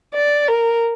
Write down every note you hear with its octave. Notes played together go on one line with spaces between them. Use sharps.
D5
A#4